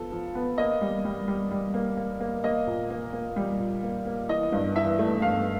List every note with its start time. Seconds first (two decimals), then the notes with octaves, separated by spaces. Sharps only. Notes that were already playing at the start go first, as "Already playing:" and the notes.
Already playing: F3 B3 A4
0.12 F3
0.35 B3
0.58 A#3 D#5
0.81 G3
1.05 G3
1.28 G3
1.51 G3
1.74 A#3
1.97 A#3
2.20 A#3
2.44 A#3 D#5
2.67 A#2
2.90 A#3
3.13 A#3
3.36 G3
3.59 A#2
3.83 A#3
4.06 A#3
4.29 E3 D#5
4.52 G2
4.76 E3 E5
4.99 A3
5.22 G2 F5